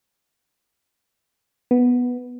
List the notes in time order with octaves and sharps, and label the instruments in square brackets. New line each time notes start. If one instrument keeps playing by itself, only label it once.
[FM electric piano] B3